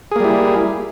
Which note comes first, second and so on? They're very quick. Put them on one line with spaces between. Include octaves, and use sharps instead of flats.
G#4 A#3 G3 E4